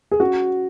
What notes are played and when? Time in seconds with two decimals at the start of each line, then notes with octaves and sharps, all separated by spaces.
0.11 G#4
0.20 C#4 F#4